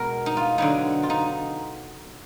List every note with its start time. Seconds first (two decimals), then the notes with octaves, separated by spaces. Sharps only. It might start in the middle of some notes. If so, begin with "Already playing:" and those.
Already playing: B2 G#3 B3 A#4
0.26 D#4
0.37 F4
0.58 D3 F#3 B3 D#4
1.03 F4
1.10 D#4